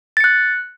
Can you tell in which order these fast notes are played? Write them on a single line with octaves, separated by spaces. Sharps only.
A6 C#7 F#6